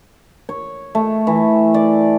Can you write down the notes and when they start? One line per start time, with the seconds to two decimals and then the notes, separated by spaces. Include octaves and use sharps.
0.49 C#5
0.95 A3
1.27 E3
1.74 D5